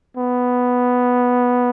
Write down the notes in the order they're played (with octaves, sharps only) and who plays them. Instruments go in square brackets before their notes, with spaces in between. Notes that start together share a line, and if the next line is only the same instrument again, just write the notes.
[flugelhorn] B3